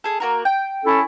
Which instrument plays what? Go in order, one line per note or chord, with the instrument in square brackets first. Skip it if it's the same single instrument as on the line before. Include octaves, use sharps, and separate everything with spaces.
[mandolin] G#4 A4
A#3 F#4 A#4
G5
[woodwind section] C#4 E4 A4